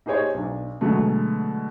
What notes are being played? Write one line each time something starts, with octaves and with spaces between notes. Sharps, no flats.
D#4 G4 G#4 C5 C#5 D#5
B1 D4
B2 D3 F#3 G#3 A3